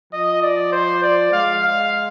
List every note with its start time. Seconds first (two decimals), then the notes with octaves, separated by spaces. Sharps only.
0.13 F3 D#5
0.42 D5
0.72 C5
1.02 D5
1.32 G#3 F5
1.62 F5